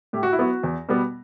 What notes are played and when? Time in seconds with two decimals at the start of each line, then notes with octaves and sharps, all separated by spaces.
0.13 A2 G4
0.23 F#4
0.33 E4
0.38 F#3 B3 F#4
0.63 E2
0.89 B2 G3 B3